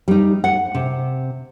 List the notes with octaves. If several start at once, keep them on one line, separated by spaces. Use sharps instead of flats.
G3 D#4
F#5
C3